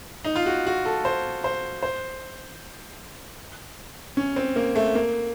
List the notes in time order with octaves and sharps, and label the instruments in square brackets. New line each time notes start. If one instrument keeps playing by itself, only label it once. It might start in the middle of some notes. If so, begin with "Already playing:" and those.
[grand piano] D#4
F4
F#4
F#4
A4
C5
C5
C5
C#4
C4
A#3
A3
A#3